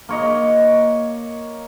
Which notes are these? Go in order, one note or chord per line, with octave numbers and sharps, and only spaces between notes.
A#3 C#5 D#5